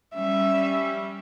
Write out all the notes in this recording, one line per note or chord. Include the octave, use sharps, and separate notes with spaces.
G3 C#4 E5